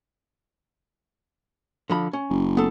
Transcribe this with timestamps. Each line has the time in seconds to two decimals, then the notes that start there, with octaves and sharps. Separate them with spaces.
1.90 D3 F3 B5
2.13 C#4
2.30 F#1
2.57 B3 A4